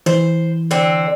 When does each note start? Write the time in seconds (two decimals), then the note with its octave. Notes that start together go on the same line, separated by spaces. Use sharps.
0.06 E3 C5
0.71 D3 C4